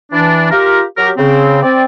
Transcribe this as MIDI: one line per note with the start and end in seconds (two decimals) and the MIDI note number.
0.12 0.48 52
0.12 0.48 62
0.51 0.82 65
0.51 0.82 67
0.51 0.82 70
0.98 1.11 54
0.98 1.11 67
0.98 1.11 70
1.18 1.59 49
1.18 1.59 60
1.62 1.84 60
1.62 1.84 74